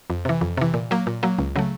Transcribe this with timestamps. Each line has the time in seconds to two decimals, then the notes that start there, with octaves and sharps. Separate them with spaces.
0.10 F2
0.25 C3 E3
0.41 F2
0.57 C3 E3
0.74 A#2
0.91 F#3 A#3
1.07 A#2
1.23 F#3 A#3
1.39 C#2
1.56 C#3 F#3 A3